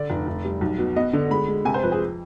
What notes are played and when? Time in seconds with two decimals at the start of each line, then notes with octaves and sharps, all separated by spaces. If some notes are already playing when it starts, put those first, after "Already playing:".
Already playing: D3 D5
0.10 F1
0.27 F1
0.44 G3
0.61 B1
0.78 B2
0.96 B3 D#5
1.13 D3
1.30 G#3 B5
1.48 G#3
1.65 C3 G#5
1.74 C5
1.83 F2 B4
1.92 G#4